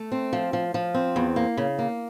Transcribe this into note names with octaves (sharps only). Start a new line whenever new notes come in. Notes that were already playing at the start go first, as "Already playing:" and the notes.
Already playing: A3
C4
F3
F3
F3
C4
E2
A#3
C#3
A#3